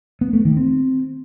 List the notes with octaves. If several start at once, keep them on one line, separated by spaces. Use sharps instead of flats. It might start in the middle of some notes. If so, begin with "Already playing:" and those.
B3
A3
D#3
C4